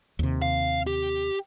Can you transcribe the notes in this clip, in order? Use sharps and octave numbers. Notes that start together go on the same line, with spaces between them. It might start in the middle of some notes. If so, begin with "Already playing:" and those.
D#2 C3
F5
G4